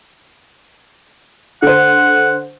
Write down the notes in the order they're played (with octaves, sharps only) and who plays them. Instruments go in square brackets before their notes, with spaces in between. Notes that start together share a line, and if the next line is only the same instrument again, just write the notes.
[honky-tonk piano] D3 C5 [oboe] F#5